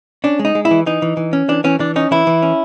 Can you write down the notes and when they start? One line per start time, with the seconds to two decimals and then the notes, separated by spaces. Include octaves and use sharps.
0.24 C#4 D4
0.39 G#3
0.45 D#4
0.55 G#3
0.65 E4
0.71 E3
0.86 E3 D#4
1.02 E3
1.17 E3
1.33 C#4
1.48 E3 D4
1.64 E3 C#4
1.80 E3 D4
1.96 C#4 D#4
2.11 E3 E4
2.27 E3
2.42 C#4